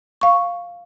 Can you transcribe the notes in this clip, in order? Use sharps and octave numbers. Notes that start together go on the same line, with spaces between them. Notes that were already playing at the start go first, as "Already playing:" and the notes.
F5 C#6